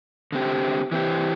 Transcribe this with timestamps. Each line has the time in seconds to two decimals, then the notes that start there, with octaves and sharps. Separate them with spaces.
0.32 D3 C4 G4
0.92 E3 C4 G4